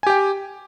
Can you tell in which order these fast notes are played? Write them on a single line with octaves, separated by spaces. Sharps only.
G#5 G4 G5